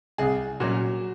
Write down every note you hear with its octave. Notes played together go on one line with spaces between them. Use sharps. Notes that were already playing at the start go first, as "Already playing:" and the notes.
C2 G#4
A#2 F#3 C#4 F#4